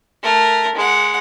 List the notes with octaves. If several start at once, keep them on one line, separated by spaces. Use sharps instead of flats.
A3 A#4
G#3 F#5